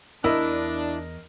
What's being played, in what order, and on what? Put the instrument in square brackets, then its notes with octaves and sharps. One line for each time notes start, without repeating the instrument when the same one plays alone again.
[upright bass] E2 [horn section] D4 [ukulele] E4 [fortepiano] A#4 D#5